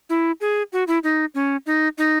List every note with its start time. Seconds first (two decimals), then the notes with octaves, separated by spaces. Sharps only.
0.09 E4
0.41 G#4
0.73 F#4
0.87 E4
1.03 D#4
1.34 C#4
1.66 D#4
1.98 D#4